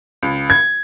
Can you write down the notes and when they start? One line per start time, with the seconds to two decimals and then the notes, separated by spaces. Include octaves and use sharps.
0.23 C#2
0.50 G#6